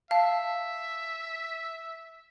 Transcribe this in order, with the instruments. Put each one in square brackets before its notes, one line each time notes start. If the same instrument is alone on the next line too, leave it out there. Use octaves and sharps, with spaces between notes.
[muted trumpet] E5 [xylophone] F5 [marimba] A5